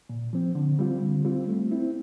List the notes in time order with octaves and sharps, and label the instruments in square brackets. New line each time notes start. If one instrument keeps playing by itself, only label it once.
[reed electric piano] A#2
F3 C4
D3
G3 C4 F4
D3
G3 C4 F4
A3
C4 E4